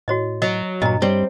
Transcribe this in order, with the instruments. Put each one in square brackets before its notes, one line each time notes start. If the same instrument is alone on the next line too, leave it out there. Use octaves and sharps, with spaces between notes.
[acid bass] A2 [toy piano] F#4 C#5 D#5
[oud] F#3 [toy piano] D#5
[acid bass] G2 [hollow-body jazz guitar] A#2 [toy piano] D#5 A#5
[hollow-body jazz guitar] G3 [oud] C4 [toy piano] C#5